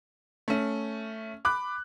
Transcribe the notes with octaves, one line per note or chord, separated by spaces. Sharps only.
A3 C#4
B5 D6 F#6